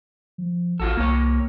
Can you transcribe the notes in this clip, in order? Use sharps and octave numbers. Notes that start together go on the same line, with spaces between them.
F3
A1 F4 F#4 A4
C2 A#3 C#5